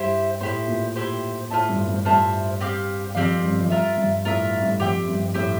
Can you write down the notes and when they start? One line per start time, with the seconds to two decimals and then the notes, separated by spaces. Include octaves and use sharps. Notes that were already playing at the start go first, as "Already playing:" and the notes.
Already playing: G2 E4 G4 C5 E5
0.41 A2 E4 G4 C5
0.68 A#2
0.96 E4 G4 C5
1.51 A2 F4 C5 E5 A5
1.69 G2
1.87 G2
2.05 G2 F4 C5 E5 A5
2.61 C4 G4 D5 F5
3.15 F2 C4 G4 D5 F5
3.43 G2
3.61 F2
3.70 G2 F4 A#4 E5
3.97 G2
4.25 A2 F4 A#4 E5
4.62 G2
4.80 F2 G4 C5 E5 G5
5.08 G2
5.34 A2 G4 C5 E5 G5